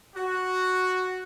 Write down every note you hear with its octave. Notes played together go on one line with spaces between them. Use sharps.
F#4